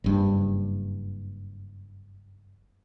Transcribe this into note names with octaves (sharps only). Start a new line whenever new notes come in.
F#1 G2